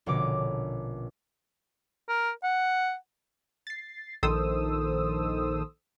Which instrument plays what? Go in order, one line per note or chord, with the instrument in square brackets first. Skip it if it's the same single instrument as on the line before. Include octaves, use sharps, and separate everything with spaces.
[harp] A#1 B2 D3 C#4 D6
[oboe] A#4
F#5
[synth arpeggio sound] A6 C7
A#1 D#3 A4 C5 D#6 E6